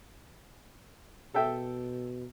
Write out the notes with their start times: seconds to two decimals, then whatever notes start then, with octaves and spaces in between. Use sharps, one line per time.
1.34 B2 A4 E5 G5